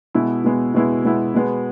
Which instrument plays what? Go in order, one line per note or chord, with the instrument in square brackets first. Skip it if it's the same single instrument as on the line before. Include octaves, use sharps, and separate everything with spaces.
[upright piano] B2 G#3 B3 E4
B2 G#3 B3 E4
B2 G#3 B3 E4
B2 G#3 B3 E4
B2 G#3 B3